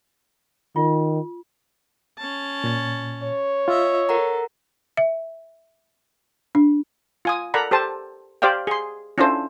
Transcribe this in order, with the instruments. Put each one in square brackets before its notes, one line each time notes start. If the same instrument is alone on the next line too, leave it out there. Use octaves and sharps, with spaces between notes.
[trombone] D#3 [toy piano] F4
[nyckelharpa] C#4 A5
[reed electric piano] A#2 A6
[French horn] C#5
[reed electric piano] F4 [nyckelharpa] D#5 E5
[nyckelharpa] A4 [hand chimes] A#4 F#5 A#5
[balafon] E5
D4
[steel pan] F4 G#5 D#6
A4 A#4 D5 F#5 A#5 B5
G4 A4 C5 A5
G4 C5 D5 F5 G5
G#4 C6
C#4 D4 E4 F4 A4 C5